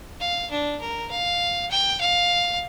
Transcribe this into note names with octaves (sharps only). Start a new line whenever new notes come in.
F5
D4
A#4
F5
G5
F5